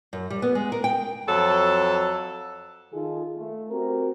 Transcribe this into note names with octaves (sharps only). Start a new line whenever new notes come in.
F#2
G3
B3
G#3
A#4
G5
F2 F#3 A4
D#3 D#4 F4 G#4 A4
A3
C4 F#4 G4 A#4